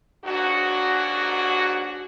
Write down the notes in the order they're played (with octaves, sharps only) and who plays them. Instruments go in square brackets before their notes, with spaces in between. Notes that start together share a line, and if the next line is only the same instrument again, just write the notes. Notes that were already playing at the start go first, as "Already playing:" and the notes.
[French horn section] D#2 G#2 D4 F#4